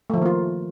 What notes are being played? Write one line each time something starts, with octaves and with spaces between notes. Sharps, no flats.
D#3 F3 A3 A#3 F4